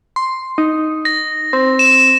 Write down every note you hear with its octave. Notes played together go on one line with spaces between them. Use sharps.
C6
D#4
A#6
C4
E7